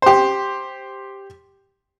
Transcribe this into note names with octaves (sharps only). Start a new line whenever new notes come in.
G4 C5